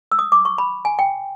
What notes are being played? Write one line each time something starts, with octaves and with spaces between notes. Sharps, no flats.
E6
D#6
D6
C#6
B5
G#5
G5